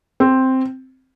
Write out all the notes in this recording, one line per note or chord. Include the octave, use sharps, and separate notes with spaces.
C4